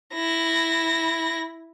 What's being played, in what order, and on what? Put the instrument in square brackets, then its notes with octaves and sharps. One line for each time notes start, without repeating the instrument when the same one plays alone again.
[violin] E4 A#6